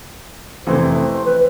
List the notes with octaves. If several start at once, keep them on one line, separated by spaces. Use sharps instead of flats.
F2 C3 E3 A3 E4 C5
C5
B4